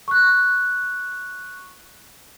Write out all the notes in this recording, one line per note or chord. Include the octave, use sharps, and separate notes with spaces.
C#6 F#6